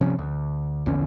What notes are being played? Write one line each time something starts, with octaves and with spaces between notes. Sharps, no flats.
G1 C3 F3 C#4
D2
A#1 E2 D3 C#4